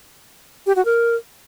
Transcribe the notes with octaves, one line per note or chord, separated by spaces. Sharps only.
G4
F#4
A#4